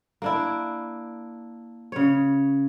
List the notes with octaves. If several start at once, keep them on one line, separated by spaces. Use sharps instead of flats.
A#3 D4 E4
C#3 C#5